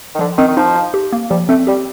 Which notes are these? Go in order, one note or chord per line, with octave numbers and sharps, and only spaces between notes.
D#3
D3 F3
D#3 C4
D#3
F3 D#4
D#4
G4
A#3
F3 G3
A3 C4
G3 G4